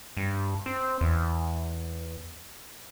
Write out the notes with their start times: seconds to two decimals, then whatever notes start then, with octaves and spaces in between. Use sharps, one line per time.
0.17 G2
0.66 C4
1.01 E2